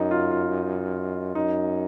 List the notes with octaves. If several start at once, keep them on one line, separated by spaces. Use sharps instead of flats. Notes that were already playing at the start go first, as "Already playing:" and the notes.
Already playing: F#2 D#4
F4
F4
F#2 D#4